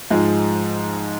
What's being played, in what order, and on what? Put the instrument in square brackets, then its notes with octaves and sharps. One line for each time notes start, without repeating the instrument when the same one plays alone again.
[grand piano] G#2 F3 G#3